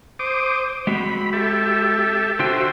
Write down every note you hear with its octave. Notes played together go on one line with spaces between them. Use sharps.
C5 D6 D#6
G#3 C4 F#4 B5
G4 A4 E5
D3 F4 F#4 C5 E5 G5